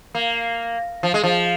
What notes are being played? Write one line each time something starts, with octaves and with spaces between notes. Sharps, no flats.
A#3
F3
G#3
F3